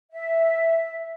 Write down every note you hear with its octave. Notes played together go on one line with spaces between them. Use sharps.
E5